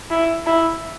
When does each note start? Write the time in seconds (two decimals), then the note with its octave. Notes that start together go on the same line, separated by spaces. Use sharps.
0.11 E4
0.46 E4